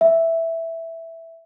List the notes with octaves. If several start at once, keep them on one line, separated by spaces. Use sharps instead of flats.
E5